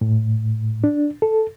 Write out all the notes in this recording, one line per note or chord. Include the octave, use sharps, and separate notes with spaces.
A2
D4
A4